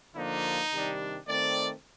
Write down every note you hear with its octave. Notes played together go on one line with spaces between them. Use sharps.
D3 F3 A#3 D4 D#4
C3 D#3 G3 D4
D#3 A3 C4 D5